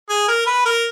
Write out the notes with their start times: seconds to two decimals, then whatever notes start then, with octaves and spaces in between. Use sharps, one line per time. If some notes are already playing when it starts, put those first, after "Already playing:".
0.09 G#4
0.28 A#4
0.46 B4
0.65 A#4